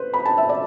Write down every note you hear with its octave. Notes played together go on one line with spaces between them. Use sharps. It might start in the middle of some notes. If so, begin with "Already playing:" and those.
Already playing: B4 C5
B5
A5
E5
D5